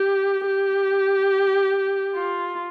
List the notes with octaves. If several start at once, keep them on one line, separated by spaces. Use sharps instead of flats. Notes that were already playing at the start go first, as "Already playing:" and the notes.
Already playing: G4
G4
F4